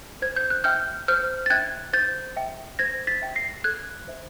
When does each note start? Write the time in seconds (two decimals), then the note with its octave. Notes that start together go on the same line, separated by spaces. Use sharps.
0.22 C5 G#6
0.36 G6
0.50 F#6
0.64 E5 G5 F6 G6
1.08 C5 F6 G6
1.46 A6
1.50 E5 G5 F#6 G#6
1.93 C5 G6 A6
2.36 E5 G5
2.79 C5 G#6 A#6
3.07 A6 B6
3.22 E5 G5
3.35 A#6 C7
3.64 A4 F#6 G#6
4.08 C5 E5